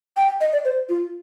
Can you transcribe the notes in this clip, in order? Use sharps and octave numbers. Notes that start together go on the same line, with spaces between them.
G5
D#5
D5
C5
F4